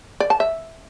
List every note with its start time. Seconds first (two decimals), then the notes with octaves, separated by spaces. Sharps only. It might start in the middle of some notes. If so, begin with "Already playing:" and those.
0.20 D5
0.30 A5
0.40 E5